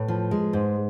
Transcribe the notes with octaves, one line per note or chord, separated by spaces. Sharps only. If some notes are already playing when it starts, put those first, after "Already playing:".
Already playing: A2 B4
F3
G#3
G#2